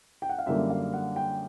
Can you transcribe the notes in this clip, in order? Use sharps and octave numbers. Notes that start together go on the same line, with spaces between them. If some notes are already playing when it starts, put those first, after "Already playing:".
G5
F#5
F5
F#2 D3 G3 A#3 D4 E5
F5
F#5
G5